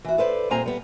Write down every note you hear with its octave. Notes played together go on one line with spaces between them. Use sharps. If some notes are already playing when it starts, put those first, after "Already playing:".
E3 F#4
A4 B4 C5 D5
A#2 G3 C4 C5 G#5 A#5
G3 B3